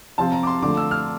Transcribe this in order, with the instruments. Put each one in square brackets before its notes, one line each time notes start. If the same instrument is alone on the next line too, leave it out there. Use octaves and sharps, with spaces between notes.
[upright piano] C3 F3 C4 F4 [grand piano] A5
[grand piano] A#5
D6
C6
[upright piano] D3 F3 A3 [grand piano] D6
[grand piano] E6
F6